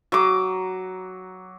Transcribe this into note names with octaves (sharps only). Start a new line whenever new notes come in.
F#3 D6